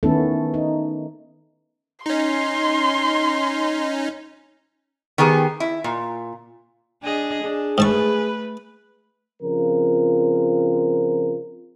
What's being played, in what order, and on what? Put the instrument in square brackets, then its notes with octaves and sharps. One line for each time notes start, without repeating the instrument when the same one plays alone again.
[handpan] D#3 A3 B3 C#4 E4 A4
D#4
[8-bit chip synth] C#4 D#4 [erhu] C6
[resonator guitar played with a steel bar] D#3 B3 G4 G#4
E4
A#2
[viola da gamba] D4 G#4 D#5
[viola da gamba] D4 [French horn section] G#4
[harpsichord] G#2 A5 C#6 [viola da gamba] A3 B4
[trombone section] C#3 F3 C4 F4 A#4